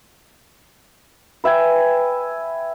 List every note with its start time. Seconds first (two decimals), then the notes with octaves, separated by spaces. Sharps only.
1.44 B4 E5 G5 G#5